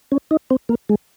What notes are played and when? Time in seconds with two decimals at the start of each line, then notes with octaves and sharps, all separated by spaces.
0.12 C#4
0.31 D#4
0.50 C4
0.69 A#3
0.89 G#3